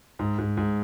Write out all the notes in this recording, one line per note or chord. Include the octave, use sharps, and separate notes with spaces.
G#2
G#2
G#2